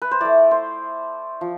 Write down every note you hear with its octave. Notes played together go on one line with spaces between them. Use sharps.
B4
C5
A3 E4 D5
C5
F3